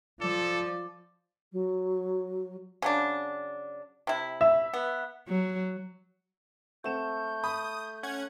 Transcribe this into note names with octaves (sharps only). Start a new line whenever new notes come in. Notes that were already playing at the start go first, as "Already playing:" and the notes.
F3 A4 D5
F#3
C#3 F#3 D4
C3 E4
E5
B3
F#3
A3 C4 F#5 G6 E7
B5 D#6
C#4 F#5 G#6